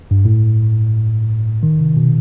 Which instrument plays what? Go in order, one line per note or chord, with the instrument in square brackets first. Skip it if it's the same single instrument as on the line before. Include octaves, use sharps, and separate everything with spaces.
[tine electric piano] G2
A2
D#3
C3
B2